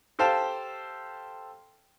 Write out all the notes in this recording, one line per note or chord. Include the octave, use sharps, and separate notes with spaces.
G4 A4 C5 F5 G5 A5